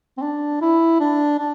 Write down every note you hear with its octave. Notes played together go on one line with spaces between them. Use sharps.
C4
D4
E4
D4
D4